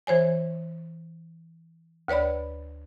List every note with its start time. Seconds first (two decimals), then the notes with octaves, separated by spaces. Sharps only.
0.07 E3 C5 C#5 G#5
2.08 D2 B4 C#5 D5 B5